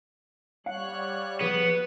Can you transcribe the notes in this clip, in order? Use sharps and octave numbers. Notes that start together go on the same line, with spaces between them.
G3 C#5 F5 F#5 F#6
F3 B3 G#4 B4